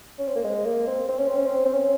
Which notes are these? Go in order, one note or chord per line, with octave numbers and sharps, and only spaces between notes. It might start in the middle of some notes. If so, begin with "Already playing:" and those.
C#4
C4
A#3
G#3
A#3
C4
C4
C#4
C4
C#4
C4
C4
C#4